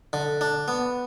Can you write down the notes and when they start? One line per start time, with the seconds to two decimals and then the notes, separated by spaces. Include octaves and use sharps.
0.13 D3
0.41 D4
0.68 B3